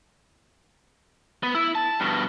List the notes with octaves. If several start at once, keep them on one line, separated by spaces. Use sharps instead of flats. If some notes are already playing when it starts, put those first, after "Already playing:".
B3
E4
A5
G2 B2